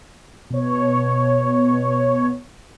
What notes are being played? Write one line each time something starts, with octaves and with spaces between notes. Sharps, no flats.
B2 C#5